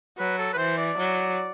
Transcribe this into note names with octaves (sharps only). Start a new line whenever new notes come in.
F#3 B4
A4
B4
E3 C5
D5
F#3